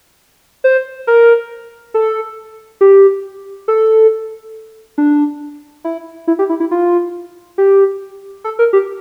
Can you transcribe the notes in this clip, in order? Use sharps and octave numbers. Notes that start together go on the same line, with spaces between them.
C5
A#4
A4
G4
A4
D4
E4
E4
G4
E4
E4
F4
G4
A4
A#4
G4